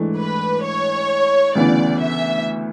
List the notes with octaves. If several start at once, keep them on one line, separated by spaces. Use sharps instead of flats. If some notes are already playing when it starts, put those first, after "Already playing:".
Already playing: G#2 E3 A3 D4
B4
C#5
D2 C#3 E3 B3 D5
E5